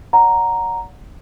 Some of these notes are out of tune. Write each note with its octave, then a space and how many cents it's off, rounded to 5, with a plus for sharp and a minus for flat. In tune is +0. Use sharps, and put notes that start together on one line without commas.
D5 -40 F#5 -10 A#5 +0